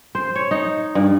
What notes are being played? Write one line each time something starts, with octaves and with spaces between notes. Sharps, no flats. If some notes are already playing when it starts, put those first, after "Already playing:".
C5
C#5
D#4
G2